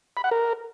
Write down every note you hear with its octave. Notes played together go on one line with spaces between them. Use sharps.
B5
F#5
A#4